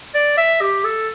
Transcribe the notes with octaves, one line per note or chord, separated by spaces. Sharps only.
D5
E5
G4
A4